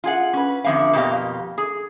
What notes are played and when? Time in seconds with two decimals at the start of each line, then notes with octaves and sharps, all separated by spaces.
0.04 F4 G#4 F#5
0.33 C#4 B4
0.64 F2 D3 A#3 E5 F5
0.93 F2 B2 A#3 G4 D#5 F5
1.58 G#4